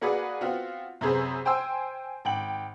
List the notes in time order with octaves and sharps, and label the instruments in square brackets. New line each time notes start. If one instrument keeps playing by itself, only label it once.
[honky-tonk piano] A#3 F#4 G#4 B4 D5 F#5
B3 C4 F4 F#4
F#2 C3 G#4 B4 C5
C5 G5 G#5 C6 E6
G#1 G5 F#7